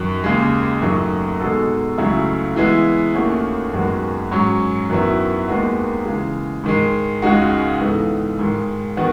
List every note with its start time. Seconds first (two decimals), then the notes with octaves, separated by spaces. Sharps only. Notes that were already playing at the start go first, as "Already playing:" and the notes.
Already playing: F#2 D#3 F#3
0.24 D#2 C#3 G#3
0.82 F#2 D#3 F#3 A3 D#4
1.40 B2 G#3 D#4 F#4 A4
1.98 C#2 C#3 F#3 A3 E4
2.56 E3 G#3 B3 E4
3.15 D#2 D#3 A3 C#4 F#4
3.73 F#2 D#3 G#3 B3 F#4
4.31 G#2 F#3 C#4
4.90 F#2 D#3 F#3 B3 E4
5.48 D#2 D#3 G#3 B3 F#4
6.05 C#3 E3 G#3
6.64 G#2 D#3 G#3
7.22 C#2 C#3 G#3 D#4 F#4
7.81 G#2 E3 B3 D#4 A4
8.39 G#2 D#3 G#3
8.97 D#3 B3 F#4